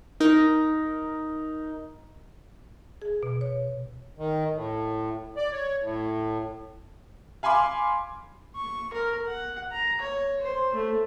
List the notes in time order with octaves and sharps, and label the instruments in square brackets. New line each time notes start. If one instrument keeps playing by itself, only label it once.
[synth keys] D#4 A#4
[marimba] G#4
B2
C#5
[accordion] D#3
A2
D5
C#5
A2
[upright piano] F5 G#5 B5 C6 D6
[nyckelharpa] C#6
A#4
F#5
A#5
C#5
C5
A3